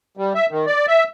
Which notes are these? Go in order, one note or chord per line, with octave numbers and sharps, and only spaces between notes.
G3
E5
D#3
D5
E5